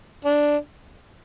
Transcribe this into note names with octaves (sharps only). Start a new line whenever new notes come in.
D4